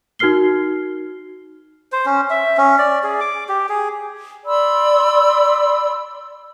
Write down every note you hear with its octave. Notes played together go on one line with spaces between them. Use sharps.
D#4 F#4 A#4 F6 C7 G7
C5
C#4
E5
C#4
D5
G#4
D6
G4
G#4
D5 B5 C6 E6